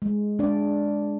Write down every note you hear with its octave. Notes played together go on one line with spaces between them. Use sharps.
G#3
G#3 D4 D5